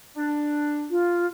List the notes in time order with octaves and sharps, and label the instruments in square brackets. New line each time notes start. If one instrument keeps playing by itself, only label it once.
[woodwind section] D4
[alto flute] F4